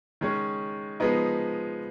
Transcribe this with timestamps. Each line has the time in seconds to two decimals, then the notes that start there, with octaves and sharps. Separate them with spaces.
0.21 D#3 G#3 C#4
1.00 F3 G#3 B3 D#4